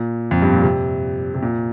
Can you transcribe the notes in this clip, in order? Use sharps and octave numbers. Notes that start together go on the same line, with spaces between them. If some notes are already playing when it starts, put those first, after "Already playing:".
Already playing: A#2
F2
G2
A#2
C3
C3
A#2